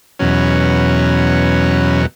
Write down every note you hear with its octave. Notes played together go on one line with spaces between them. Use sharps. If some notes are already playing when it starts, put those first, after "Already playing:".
E2 B2 F#3 C#4